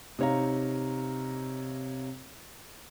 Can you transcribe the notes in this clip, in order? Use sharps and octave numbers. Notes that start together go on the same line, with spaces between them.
C3 D#4 C#5 F5 A#5